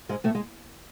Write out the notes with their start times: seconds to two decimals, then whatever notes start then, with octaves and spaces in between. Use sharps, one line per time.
0.09 G#2 G#3
0.24 A2 A3
0.35 G#3